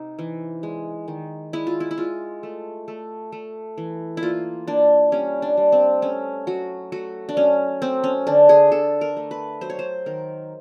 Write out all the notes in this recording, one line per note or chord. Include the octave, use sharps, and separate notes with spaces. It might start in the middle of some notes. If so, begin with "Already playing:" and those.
Already playing: C3 D#4
E3
G#3
D#3
G#3 E4
F4
E4
E4
G#3 F4
A3
A3
A3
E3
E4
A#3 F4
A#3 D4
G3 C#4
D4
G3
C4
A3 C#4
F#3 F#4
A3 F#4
D4
F#3 C#4
A3 C4
C#4
D3 D4
G#4
D3 A4
A#4
A3
B4
F#3 C5
C#5
C5
D#3 A#4